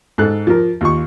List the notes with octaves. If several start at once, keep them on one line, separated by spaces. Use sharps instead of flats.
G#2 A4 F#6
F3 A#4
D#2 F4 C#6